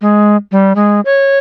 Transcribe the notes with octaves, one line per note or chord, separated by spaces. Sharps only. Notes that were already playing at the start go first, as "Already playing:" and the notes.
G#3
G3
G#3
C#5